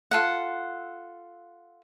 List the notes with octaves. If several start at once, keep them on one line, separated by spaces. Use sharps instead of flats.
F4 A4 F#5